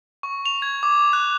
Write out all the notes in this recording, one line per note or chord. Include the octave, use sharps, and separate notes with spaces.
C#6
F7
G#6
D6
F#6